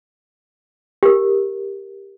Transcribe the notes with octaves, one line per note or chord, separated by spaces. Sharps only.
G4 A#4